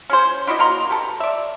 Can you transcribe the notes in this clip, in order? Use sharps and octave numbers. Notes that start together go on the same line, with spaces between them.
C#4 G#4 C5
D4 E4 F#4 D#5
A#3 F#4 A#5 C6
G4 A4 B4
D5 E5